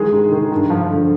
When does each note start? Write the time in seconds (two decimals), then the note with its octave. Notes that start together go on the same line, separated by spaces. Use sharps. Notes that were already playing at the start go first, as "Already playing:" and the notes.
Already playing: D#3 E3 G#3 G#4
0.12 G#2
0.32 D#3
0.52 G2
0.70 F3
0.90 D3